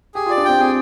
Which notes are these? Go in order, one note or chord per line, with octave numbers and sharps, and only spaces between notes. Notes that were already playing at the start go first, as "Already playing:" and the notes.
G4 G#4
F4 D5
D4
C4 G5
C4 G#4